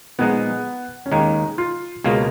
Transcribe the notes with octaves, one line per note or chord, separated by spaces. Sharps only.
A#2 F3 G#3 B3 D#4 G#4
C#4
D#2 D#3 G#3 D#4
F4
C#2 B2 A#3 F4 G#4